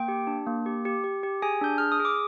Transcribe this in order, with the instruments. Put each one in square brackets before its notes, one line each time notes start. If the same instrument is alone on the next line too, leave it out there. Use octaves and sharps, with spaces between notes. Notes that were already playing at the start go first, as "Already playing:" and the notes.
Already playing: [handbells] A#3 G5
G4
D4
A#3
G4
G4
G4
G4
G#4 G#5
D4 G6
G#4 F6
D#6
G#4
D6